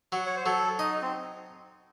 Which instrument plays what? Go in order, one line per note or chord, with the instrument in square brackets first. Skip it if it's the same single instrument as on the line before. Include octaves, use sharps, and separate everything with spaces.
[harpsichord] F#3 [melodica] F#5
[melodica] C#5
C5
[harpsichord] F#3 [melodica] A4
[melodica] D#4 [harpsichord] D#5
[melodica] C4